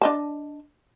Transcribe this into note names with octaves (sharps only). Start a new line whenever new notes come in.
D4 D#5 A5